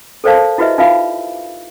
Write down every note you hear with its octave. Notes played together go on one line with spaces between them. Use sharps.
A4 A#4 C5 D5 F5 A5
E4 F#4 G4 B4 D#5 E5
D#4 F4 B4 E5 F5 B5